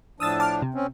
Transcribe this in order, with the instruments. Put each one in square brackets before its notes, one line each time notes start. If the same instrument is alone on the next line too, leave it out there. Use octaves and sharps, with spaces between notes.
[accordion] A2 F3 D4 [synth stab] D#6 E6 A6
[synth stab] A5 D6 F6
C3
[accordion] C4 C#4